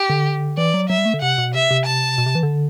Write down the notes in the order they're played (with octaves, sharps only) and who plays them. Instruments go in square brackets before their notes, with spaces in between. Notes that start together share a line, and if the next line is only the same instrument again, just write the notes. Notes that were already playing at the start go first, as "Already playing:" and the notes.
Already playing: [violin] G4
[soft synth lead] D3
[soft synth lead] E3 [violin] D5
[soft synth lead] F#3
[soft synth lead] F#3 [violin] E5
[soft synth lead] G3
A3
D3
[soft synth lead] C3 [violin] F#5
[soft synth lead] B2
[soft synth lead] C3 [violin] E5
[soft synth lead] C3
[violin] A5
[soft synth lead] B2
C3
E3
D3